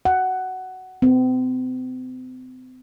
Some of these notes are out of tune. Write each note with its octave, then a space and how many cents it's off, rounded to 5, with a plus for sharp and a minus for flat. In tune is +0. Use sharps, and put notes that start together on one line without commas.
F#5 +10
C4 -40